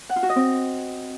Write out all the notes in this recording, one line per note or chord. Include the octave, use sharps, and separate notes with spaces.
F#5
F4
F#4
D#5
C4